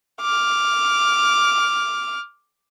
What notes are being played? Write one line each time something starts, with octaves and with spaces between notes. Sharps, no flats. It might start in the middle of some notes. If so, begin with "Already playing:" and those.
D6 F6